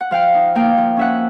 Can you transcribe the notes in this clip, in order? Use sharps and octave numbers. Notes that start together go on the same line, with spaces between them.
F#5
F3 F5 G5
D#4
A#3 F5 G5
F3
C#4 E5 F#5